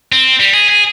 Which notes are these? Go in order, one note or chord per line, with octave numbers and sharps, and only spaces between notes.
C4
G3
G#4
G#4